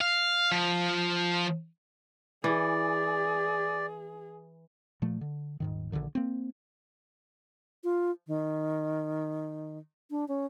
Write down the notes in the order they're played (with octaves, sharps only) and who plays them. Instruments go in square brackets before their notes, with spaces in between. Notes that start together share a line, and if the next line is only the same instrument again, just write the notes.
[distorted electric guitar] F5
F3
[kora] E3 [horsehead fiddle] G#4 [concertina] D5
[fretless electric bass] A#2 F3 A3
D3
D#1 G#2 D#3
A#1 D#2 D3 D#3
A#3 C4
[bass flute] F4
D#3
D4
C#4